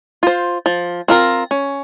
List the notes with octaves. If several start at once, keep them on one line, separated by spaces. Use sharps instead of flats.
F4 C5
F3
C4 F4 A#4
C#4